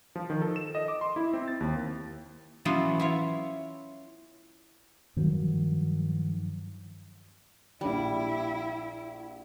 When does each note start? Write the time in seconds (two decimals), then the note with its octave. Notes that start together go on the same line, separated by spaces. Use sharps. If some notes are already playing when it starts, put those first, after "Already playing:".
0.16 F3
0.30 D#3
0.42 A4
0.56 E7
0.75 D#5
0.88 D6
1.01 C6
1.16 E4
1.33 C4
1.48 A6
1.60 D#2
2.65 E3 F#3 B3 C#4 E4 F4
3.00 E4 F4 C#5
5.16 G2 D#3 F3 F#3
7.81 A#1 G3 D4 E4